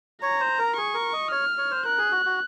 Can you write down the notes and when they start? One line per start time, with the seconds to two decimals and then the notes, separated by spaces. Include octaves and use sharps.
0.22 C#5 A#5
0.40 C5
0.59 A#4
0.76 G#4 C#6
0.94 A#4
1.13 D#5
1.31 C#5 F6
1.58 C#5
1.71 C5
1.85 A#4 F#6
1.98 G#4
2.12 F#4
2.26 F#4